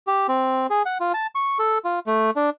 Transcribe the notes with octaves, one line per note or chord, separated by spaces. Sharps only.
G4
C4
G#4
F#5
F4
A5
C#6
A4
F4
A3
D4